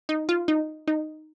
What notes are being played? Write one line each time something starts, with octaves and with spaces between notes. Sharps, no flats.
D#4
F4
D#4
D#4